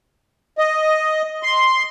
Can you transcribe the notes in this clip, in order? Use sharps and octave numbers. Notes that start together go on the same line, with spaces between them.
D#5
C6